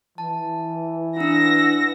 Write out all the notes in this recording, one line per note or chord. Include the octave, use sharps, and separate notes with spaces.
E3 A5
D4 E4 B4 F#5 E6 A#6